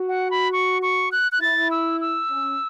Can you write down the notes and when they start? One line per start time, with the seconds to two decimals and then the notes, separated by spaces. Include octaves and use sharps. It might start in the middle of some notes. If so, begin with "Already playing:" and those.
Already playing: F#4
0.09 F#5
0.31 B5
0.53 C#6
0.82 C#6
1.12 F#6
1.32 F#6
1.41 E4 A6
1.71 E6
2.01 E6
2.30 C#4